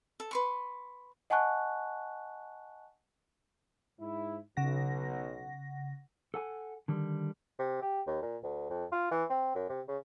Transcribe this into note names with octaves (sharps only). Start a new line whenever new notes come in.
A4
B4 C6 C#6
D#5 F#5 G#5 A5 C#6 F#6
G#2 E4
B1 C#3 F#5 A#6
A4 F#5 G#5
D3 D#3 G3
C3
G4
D#2
A#2
D2
F2
F4
E3
C4
F#2
C3
C#3